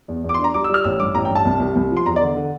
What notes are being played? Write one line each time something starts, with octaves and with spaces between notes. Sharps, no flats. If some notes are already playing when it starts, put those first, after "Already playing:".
E2
E2
D6
C6
D4
A#5
G3 D6
E6
G3 F6
A1 E6
G2 D6
A1 A#5
G5
G2
A5
C2
C2
C2
F3
C6
E2 A#5
D5
D3
D3